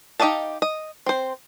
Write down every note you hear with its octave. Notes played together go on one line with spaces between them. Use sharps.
D#4 G4 D#5 F5 A5
D#5
C4 C5